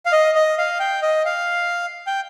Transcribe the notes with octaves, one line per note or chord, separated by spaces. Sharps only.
F5
D#5
D#5
F5
G5
D#5
F5
G5